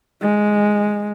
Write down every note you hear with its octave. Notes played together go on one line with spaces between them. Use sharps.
G#3